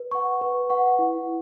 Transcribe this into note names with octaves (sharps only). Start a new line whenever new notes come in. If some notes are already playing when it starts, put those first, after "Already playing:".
Already playing: B4
F#5 C#6
B4
F#5 C#6
E4